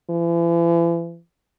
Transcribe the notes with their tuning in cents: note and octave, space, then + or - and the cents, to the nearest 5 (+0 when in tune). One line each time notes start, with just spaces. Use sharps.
E3 +40